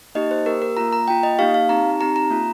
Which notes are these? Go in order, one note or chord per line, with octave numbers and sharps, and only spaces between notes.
A#3 D#4 G4 D#5
C5
A#3 G4 A#4
A#4
A#3 F4 A#5
A#5
A#3 F4 G5
D#5
A#3 D#4 G4 F5
F5
C4 D#4 G4 A#5
C4 D#4 G4 A#5
A#5
A#3 F4